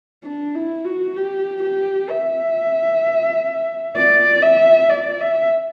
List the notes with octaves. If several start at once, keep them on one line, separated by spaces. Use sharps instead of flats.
D4
E4
F#4
G4
G4
E5
D5
E5
D5
E5